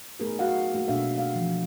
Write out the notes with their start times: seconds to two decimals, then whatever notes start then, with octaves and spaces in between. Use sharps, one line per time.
0.20 A3 B3 D#4 G#4 A#4 B4
0.39 F#4 B4 F5 F#5
0.74 A3 A#3 F#4
0.88 B2 B3 D4 A4 E5 F5
1.16 A3 F5 F#5
1.35 E3 F3